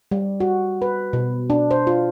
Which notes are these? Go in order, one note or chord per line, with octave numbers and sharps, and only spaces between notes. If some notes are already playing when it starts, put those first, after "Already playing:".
G3
F#4
B4
B2
D4
C5
F4